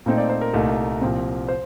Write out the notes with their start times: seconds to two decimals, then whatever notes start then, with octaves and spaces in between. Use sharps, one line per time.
0.06 A#2 A3 C4 D#4
0.18 D5
0.29 C5
0.41 A#4
0.53 C2 A#2 A3 D#4
1.01 C2 A#2 F3 C4
1.48 C5